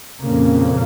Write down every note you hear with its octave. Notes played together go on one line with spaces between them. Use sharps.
F2 A#2 C#3 A#3